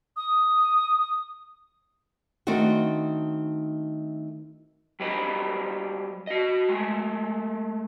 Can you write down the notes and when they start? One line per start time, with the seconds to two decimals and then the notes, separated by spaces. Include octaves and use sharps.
0.16 D#6
2.47 D#3 A3 C4 D4 D#4 F#4
5.00 F#3 G3 B4 C5 D#5
6.27 F#4 D#5
6.69 G#3 A3